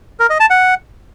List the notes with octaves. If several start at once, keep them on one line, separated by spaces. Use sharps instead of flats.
A#4
D#5
A5
F#5